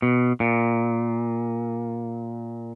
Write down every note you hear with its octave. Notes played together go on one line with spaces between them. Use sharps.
B2
A#2